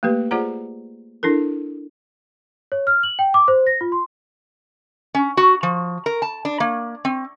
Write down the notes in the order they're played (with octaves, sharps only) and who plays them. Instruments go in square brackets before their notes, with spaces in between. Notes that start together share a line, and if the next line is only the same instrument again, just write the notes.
[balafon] A3 A#3 G4 B4
F4 G#4 C5 D5 F#5 A#5
D4 E4 A4 A#4
[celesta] C#5
F6
F#7
G5
D6
C5
A#6
F4
C6
[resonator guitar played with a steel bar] C#4
F#4
F3
A#4
A5
D4
A#3
C4